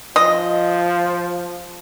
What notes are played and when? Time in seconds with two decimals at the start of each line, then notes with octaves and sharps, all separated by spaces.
0.16 F3 D#5